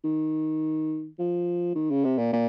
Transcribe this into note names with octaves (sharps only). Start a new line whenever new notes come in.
D#3
F3
D#3
C#3
C3
A#2
A#2